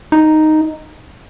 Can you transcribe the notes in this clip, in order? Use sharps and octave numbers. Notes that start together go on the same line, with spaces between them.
D#4